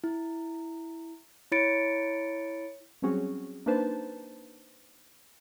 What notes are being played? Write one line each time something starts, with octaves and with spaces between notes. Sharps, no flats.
E4
E4 C#5 B5 A6 C#7 D7
F#3 G3 C4 C#4 F#4 G#4
A#3 D4 D#4 B4 C5 A5